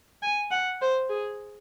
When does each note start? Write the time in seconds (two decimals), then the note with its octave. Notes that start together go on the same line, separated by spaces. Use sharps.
0.22 G#5
0.51 F#5
0.81 C5
1.09 G#4